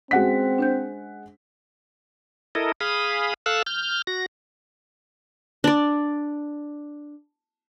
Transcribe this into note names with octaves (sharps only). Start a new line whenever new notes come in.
G#3 C4 C#4 F#4 F#5 B6
D4 C5 G6
E4 A4 A#4 D#5
G#4 F5 B5 D#6
A4 F5 E6 F#6
F6 G6
F#4 A#6
D4 D5